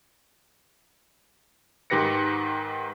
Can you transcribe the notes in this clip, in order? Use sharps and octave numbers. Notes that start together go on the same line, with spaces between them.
G#2 D#3 G4 B4 A#6 C#7